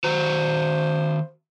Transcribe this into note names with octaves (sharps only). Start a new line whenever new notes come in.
D#3 F#4 C5 A#5